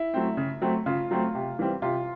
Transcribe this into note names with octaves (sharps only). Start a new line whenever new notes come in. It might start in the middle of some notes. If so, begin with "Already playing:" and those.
Already playing: E4
F#3 A3 C4
C#3
F#3 A3 C4
C#3 F4
F#3 A3 C4
C3
E3 G3 C4
C3 F4